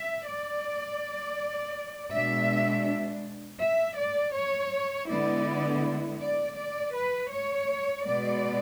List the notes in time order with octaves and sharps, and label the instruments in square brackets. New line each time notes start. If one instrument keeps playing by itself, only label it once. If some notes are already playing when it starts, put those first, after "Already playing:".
Already playing: [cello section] E5
D5
B2 G#3 D4 E5
E5
D5
C#5
D3 G#3 B3 E4 D5
D5
D5
B4
C#5
B2 G#3 B3 D5